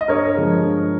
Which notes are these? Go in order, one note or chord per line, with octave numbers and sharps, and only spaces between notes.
D#5
G2 A#4 C#5
F3 G#3
G2